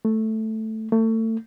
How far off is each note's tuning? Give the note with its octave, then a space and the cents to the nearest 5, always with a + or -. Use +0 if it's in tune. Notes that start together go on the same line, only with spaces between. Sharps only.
A3 +0
A3 +30